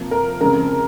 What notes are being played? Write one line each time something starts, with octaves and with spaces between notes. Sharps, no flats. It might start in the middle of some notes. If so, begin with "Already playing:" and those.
Already playing: C3 F3 A#3
A#4
F2 C#3 F3 G#3 C4 A#4